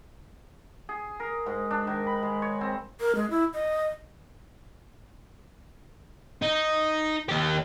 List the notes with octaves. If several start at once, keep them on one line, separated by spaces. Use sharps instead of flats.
G#4
A#4
G#2
D4
D#3
B5
G#3
C#5
C4
A#4
G#3
E4
D#5
D#4
D#2 G4